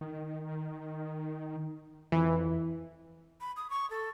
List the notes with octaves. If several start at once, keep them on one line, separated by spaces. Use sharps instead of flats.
D#3
F2 E3
B5
D#6
C#6
A4